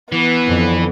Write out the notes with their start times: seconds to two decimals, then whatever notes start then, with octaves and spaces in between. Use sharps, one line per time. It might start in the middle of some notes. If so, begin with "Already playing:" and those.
0.12 E3 B3
0.45 F2 D3